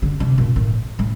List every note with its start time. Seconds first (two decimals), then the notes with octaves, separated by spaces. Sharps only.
0.02 D3
0.20 C3
0.38 A#2
0.56 A2
0.99 A2